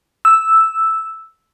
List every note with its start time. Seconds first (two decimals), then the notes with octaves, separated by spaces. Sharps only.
0.25 E6